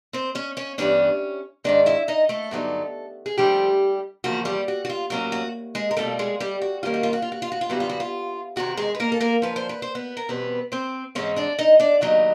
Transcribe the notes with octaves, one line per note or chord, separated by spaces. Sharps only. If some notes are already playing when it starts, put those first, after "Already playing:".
C4 C5
C#4 C#5
C#4 C#5
G2 E3 G3 B3 C#4 D4 C#5
G#2 D#3 G#3 D4 D5
E4 E5
D#4 D#5
A3 A4
G2 D3 F#3 B3 D#4
G#4
C#3 F3 G3 A3 D4 G4
E2 C#3 F3 A#3 C#4 F#4
G3 G4
F#4
F#4
F4
A2 F#3 A#3 C#4 F#4
F#4
G#3 G#4
A#4
B2 G3 A3 C4 F4 A4
G#3 G#4
G3 G4
F#4
D#2 D#3 G3 A#3 C#4 F4
F#4
F4
F#4
F4
F#4
F4
F#4
F4
F#2 D3 G3 B3 E4 F#4
F4
F#4
F4
E2 C3 D#3 F#4
G#3 G#4
B4
A#3 A#4
A4
A#3 A#4
F#2 D3 F3 B4
C5
B4
C5
B3 B4
A#4
E2 B2 G3 B3 C4 B4
C4 C5
G#2 E3 G#3 C4 C#4 C#5
D4 D5
D#4 D#5
D4 D5
D#2 C#3 F#3 B3 D#4 D#5